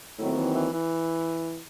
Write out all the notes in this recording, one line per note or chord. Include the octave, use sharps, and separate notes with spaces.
D#2 A2 D#3 F#3 C4 E4
E3
E3
E3